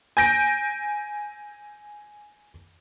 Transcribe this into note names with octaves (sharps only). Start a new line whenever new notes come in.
G#5 G6 A#6 D7